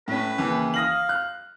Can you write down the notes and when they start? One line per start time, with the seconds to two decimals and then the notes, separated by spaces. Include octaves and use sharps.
0.08 A2 C#4 B4
0.38 D#2 C#3 E3
0.74 F5 D#6 A#6 F#7
1.09 F#6